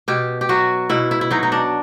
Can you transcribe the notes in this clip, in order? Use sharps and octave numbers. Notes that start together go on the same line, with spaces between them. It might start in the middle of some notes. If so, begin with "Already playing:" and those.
B2 G4
G4
F#3 F#4
B2 E4
E4
E4
F#3 D#4
D#4
D4